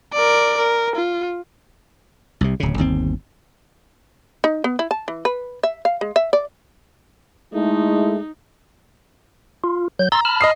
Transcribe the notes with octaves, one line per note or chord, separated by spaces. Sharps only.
A#4 D5
A#4
F4
C2 C3
D1 C#3
G1 D#2 C4
D#4
B3
E4
A5
E3
B4
E5
F5
G#3
E5
D5
G#3 A3 D#4 E4
F4
F#3 G6
A#5 C6 E6 A6
A5 B5 F6
D#5 D#6 C7